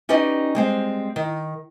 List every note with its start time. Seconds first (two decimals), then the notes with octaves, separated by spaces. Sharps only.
0.09 C#4 D#4 G4 B4 D5 D#5
0.55 G3 G#3 C4
1.16 D#3